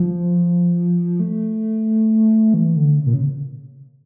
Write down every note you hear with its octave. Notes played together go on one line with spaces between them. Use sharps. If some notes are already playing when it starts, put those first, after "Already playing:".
Already playing: F3
A3
E3
D3
C#3
A#2
C#3